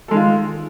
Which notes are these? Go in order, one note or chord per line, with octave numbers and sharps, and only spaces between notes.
D#3 G#3 F4 A4